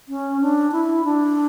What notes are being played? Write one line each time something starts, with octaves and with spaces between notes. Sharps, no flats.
C#4
D4
E4
D4